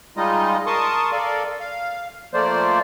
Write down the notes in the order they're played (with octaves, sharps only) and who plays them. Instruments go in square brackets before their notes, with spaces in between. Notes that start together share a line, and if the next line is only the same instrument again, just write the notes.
[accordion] G3 G#3 D#4 F4 D#5
A#4 A5 C6 C#6 D#6
A4 A#4 D5 F5
F5
F3 A3 A#3 C5 D5